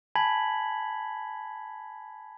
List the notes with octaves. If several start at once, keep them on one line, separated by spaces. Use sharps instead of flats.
G#5 A5 B5 G#6 B6 F#7